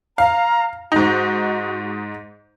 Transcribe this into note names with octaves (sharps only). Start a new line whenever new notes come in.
F5 A#5
G#2 D#4 F#4